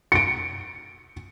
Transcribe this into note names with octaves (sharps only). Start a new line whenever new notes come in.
C#7 D7